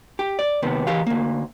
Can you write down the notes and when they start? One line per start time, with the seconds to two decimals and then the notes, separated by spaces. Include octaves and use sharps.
0.19 G4
0.39 D5
0.63 D#2 C3 B3
0.87 E3 G4 F5
1.07 D2 A#3